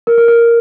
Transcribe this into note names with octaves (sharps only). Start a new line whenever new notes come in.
A#4
A#4
A#4